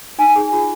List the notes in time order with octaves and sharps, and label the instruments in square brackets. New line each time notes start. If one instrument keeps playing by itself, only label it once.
[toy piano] D#4 G#5
G#4
F4